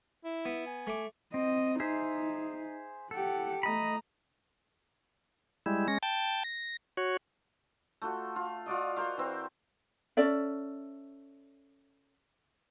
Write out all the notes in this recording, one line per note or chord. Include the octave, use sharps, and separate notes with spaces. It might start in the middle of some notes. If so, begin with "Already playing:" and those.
E4
B3
G#5
A3 D6
C4 D#5
D#4 G#4 C5 E5
G4 A4 F#5
A3 D#5 A#5 B5
G3 G#3 E4
G#3 C#4 A#6
G5 A5
A#6
F#4 C#5
A3 F4 F#4
F4
F4 F#4 D5 D#5
F#4 A#4 C5 F5
E3 C4
C#4 A4 D5 E5